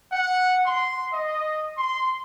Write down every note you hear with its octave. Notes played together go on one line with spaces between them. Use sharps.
F#5
C6
D#5
C6